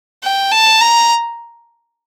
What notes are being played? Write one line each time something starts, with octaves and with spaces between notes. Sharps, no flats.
G5
A5
A#5